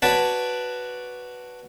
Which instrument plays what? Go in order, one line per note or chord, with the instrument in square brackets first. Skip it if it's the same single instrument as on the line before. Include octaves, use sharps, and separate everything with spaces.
[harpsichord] F#4 B4 C#5 D5 A5